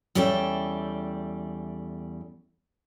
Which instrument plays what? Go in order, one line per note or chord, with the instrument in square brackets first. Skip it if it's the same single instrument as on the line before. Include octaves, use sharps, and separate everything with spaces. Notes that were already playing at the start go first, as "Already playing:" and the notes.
[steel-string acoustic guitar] E2 G3 C#4 A4 E5 G5